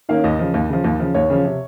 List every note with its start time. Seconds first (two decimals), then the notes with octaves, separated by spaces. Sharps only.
0.09 D#3 A#3 C#4 F5
0.24 D#2 D#5
0.39 C#3 F3
0.54 D#2
0.69 C#3 F3
0.84 D#2
1.00 C#3 F3
1.15 D#2 C#5
1.30 C#3 F3
1.45 C3